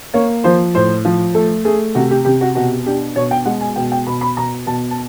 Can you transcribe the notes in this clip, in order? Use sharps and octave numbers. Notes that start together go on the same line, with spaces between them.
A#3 C#5
F3 C5
A2 C5
F3
A3 A4
A3 G#4
C3 F#4
G4
C3 G4
F#4
B2 F#4
D4 G4
B2 C#5
G5
G#3 F#5
G#5
B2 G5
G5
B2 B5
B5
B2 A#5
B2 A5
A5